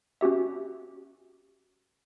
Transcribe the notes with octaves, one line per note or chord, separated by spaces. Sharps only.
C#4 F#4 G4 E5